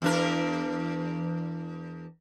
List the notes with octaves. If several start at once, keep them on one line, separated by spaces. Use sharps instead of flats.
E2 D4 A#4